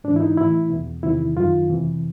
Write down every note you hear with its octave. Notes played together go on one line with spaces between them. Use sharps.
G#2 E3 D4
E4
D#4
A2 E3 E4
E2 B2
E2 C3 D#3 E4
F#2 D#3 F4
F2 C3 E3